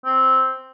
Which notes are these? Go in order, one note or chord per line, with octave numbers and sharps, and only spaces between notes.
C4